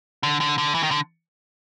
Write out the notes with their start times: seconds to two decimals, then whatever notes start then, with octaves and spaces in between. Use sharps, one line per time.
0.23 D3
0.41 D3
0.58 D3
0.75 E3
0.83 D#3
0.91 D3